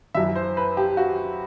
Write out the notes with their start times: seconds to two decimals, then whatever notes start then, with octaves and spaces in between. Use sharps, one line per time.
0.15 F#2 E3 E5
0.35 C5
0.57 B4
0.77 G4
0.97 F#4